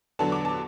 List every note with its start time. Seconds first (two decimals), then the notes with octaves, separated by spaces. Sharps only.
0.19 E2 D3 F#3 B3 D4 A5
0.32 D6
0.45 A5